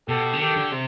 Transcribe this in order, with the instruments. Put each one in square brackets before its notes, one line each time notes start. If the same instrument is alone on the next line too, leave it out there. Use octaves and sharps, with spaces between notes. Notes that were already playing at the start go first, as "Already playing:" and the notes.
[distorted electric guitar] B2 [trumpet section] G4 A4
[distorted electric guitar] D3
[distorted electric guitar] D#3 [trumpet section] G4 A4
[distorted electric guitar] D3
C3